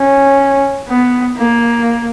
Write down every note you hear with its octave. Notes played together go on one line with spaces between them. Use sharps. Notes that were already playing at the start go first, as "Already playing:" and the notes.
Already playing: C#4
B3
A#3